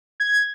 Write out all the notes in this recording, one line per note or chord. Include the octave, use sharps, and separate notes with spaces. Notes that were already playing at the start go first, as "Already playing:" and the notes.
G#6